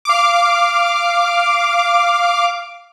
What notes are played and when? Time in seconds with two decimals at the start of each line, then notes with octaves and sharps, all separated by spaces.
0.05 F5 D6